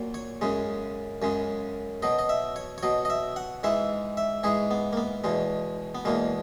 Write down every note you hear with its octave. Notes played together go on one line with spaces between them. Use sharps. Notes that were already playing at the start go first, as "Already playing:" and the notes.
Already playing: A#2 F#3
C#5
F#2 C#3 G#3
F#2 C#3 G#3
B2 F#3 D#5
D#5
E5
C#5
C#5
B2 F#3 D#5
D#5
E5
F#5
G#2 E3 G#3 E5
E5
G#2 E3 G#3 G#4
B3
A#3
B3
E2 B2 G#3
B3
E2 B2 G#3 A#3